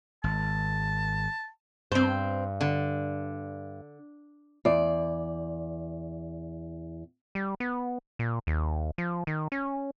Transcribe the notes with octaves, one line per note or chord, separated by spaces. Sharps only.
G#1 A5
G2 C4 C5
D3
E2 D5
G3
B3
A#2
D#2
F3
D#3
C#4